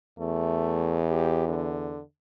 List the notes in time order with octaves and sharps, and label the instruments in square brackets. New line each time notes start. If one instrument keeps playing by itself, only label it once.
[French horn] E2 [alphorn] A3
[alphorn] G4
D3